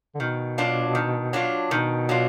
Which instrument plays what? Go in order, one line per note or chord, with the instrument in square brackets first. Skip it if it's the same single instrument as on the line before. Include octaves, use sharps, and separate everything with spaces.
[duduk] D3
[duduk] B2 [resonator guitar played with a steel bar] D#3
[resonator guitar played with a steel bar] F#3 D4 F4
D#3
F#3 D4 F4
[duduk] B2 [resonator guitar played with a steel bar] D#3
[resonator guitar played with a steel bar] F#3 D4 F4